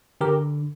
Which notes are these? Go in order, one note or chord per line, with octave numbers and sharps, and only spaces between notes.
D3 G4 A#4